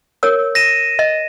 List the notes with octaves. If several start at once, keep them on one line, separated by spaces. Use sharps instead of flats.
A#4 C#5 E6
A#6 D#7 E7
D#5